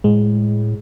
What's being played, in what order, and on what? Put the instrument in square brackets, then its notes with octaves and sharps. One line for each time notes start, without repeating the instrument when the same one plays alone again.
[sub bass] A2 [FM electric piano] G#3